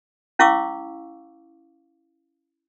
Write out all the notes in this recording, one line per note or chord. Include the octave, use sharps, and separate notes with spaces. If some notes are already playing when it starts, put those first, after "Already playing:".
C#4 E4 F5 C#6 D6 E6